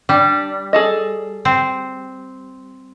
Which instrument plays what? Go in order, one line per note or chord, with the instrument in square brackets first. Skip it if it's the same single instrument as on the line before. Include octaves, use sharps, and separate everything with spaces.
[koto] G3 [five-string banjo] D4
[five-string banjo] G#4 A4 D#5
[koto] C4